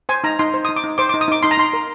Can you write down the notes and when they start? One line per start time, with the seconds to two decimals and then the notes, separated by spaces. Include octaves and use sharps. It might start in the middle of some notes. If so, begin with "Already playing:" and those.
0.09 C5 G#5
0.24 D#4 A#5
0.39 D#4 C6
0.54 C5
0.65 D#4 D#6
0.76 D6
0.84 D#4
0.98 C5 D6
1.09 D#4 D6
1.21 D#6
1.28 D#4 D6
1.43 D#4 C6
1.51 A#5
1.58 D#4 C6
1.73 A#4